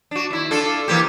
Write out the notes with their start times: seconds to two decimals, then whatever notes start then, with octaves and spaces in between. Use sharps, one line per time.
0.11 D4 F#4
0.31 D#2 E4
0.51 D4 F4 A4
0.88 E3 A#3 G4